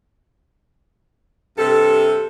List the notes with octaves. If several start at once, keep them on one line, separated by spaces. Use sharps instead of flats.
G2 C3 A4